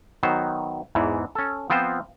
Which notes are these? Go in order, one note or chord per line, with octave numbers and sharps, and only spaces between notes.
D#3 F#3 B3 C5
E2 G#2 E3
C#4 A4
F3 B3 C4 F4 C5